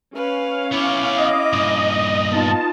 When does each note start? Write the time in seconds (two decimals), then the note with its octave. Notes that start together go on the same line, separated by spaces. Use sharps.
0.15 C#4 B4 F5
0.72 B3 E4 C#5 D6
1.16 D#5
1.53 G2 A#2
2.31 B3 D#4 F4 A5